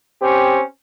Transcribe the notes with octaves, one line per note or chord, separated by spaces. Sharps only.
C4 C#4 G4